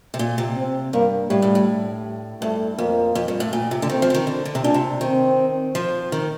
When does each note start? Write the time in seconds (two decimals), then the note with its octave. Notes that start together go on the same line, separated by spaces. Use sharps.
0.14 C3
0.19 A#2
0.38 C3
0.57 C4
0.93 G2 A#3
1.30 A2 G3
1.42 A2
1.55 A2
2.42 G2 A3
2.78 F2 A#3
3.15 F2
3.28 G2
3.40 A2
3.53 A#2
3.71 C3
3.82 D3
3.90 D#3 C4
4.02 F3
4.10 D3
4.14 D#3
4.27 D3
4.45 D3
4.55 C3
4.63 A#2 D4
4.74 C3
5.01 D#3 C4
5.75 F3
6.12 D#3